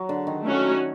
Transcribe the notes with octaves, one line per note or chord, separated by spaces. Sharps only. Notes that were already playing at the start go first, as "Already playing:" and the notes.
Already playing: F#3
D3
D#3
A3 C#4 F#4